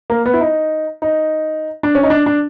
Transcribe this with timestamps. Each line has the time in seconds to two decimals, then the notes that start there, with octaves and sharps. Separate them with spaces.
0.10 A#3
0.26 B3
0.34 E4
0.41 D#4
1.02 D#4
1.83 D4
1.95 C#4
2.03 D#4
2.10 D4
2.26 D4